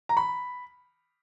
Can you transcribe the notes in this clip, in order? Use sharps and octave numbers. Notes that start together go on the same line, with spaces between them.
A#5
B5